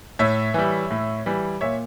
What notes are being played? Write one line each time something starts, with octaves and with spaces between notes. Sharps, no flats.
A2 C#5 E5
E3 G3
A2
E3 G3
A#2 C#5 E5